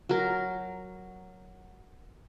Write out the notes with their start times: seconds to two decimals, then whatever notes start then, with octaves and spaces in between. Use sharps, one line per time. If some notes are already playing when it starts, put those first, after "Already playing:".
0.09 F#3 A#4